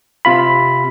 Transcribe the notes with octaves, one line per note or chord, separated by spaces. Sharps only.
C3 F4 B5